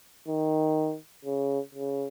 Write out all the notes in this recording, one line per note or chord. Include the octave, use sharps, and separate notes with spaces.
D#3
C#3
C#3